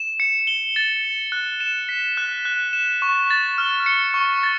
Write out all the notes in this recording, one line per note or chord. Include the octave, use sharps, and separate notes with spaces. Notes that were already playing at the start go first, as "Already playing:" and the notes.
Already playing: E7
C#7
G7
A6
E7
F#6
E7
B6
F#6
F#6
E7
C#6
A6
F6
C#7
C#6
A6